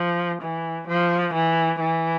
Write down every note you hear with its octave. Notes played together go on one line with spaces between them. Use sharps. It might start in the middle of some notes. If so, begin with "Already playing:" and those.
Already playing: F3
E3
F3
E3
E3